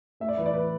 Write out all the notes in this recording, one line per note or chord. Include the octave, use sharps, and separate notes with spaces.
A3 E5
D5
E2 B4
D5
E3 B4